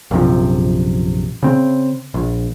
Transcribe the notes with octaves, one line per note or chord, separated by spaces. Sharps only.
A#1 F#2 C3 F3
C#3 C4
A#1